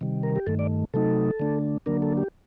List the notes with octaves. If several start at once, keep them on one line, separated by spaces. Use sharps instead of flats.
C3 D#3 G3
A#4
G4
G2 D#3 A3 A4
D5
C3 F#3 A3 D#4 A4
D3 A3 D4
D3 F#3 A#3 D4 A#4
A4
G4